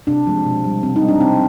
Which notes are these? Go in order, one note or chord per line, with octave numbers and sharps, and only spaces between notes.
C3 D4
F3 G#3
B2
G3
C3 C4
D#4
G3
D4
C3 C4